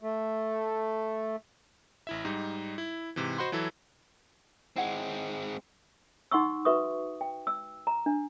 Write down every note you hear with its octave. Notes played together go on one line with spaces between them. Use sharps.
A3
A1 E4 E5
G#2 G3 D#4
E4
G#2 C3 E3
F#4 C5 D#5 F#5 B5 C6
E3 F#3 E4 A4
G#3 C4 E4 C#5 F#5
D#4 F#5 C6 C#6 E6
F#4 B4 E5 C#6 D#6
G5
E6
A#5
D4